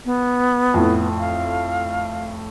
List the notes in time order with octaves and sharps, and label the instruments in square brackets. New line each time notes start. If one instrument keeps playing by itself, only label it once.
[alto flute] B3
[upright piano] F2 A2
[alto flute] F5